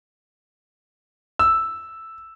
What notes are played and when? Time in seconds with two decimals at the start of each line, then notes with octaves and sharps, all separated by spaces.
1.39 E6